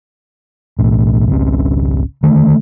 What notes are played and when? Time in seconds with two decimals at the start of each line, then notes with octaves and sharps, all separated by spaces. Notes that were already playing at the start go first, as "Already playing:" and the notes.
0.79 B1 A2
1.30 G#1 C#2 C4 C#4
2.23 D3 D#3 A3